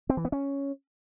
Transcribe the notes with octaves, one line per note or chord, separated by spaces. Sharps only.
C4
E3
B3
C#4